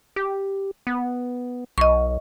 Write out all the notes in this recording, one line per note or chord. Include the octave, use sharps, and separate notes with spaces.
G4
B3
B1 D#5 C#6